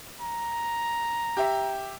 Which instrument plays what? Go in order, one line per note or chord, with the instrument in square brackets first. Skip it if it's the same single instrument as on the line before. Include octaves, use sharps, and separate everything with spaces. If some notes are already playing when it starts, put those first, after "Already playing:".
[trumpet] A#5
[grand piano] G4 E5